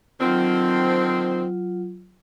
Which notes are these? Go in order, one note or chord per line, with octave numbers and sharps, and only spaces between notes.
D3 D#3 F#3 C4 F4